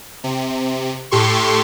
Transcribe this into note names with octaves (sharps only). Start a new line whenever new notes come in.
C3
A2 G4 A4 C6 C#6